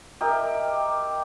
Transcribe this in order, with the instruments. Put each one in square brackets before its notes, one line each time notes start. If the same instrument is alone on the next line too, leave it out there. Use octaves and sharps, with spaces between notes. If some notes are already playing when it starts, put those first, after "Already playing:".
[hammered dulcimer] G4 A#4 D#5 E5